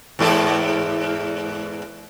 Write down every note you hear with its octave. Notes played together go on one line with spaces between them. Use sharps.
E2 G#2 A4